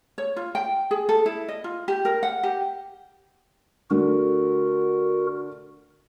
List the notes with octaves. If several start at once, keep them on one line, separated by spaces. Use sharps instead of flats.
C#5
F4
G5
G#4
A4
E4
D#5
F4
G4
A#4
F#5
G4
D3 A3 F#4 A#4